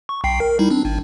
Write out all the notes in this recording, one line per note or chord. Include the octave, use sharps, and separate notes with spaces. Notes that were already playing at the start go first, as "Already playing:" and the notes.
C#6
B1 G5 C7
A#4
G3 D#4 E4
C4 D4
G#1